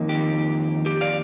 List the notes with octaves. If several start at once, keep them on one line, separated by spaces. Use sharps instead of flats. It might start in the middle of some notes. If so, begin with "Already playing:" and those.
Already playing: F2 D#3 A#3 D#4
G4
G4
D5 F5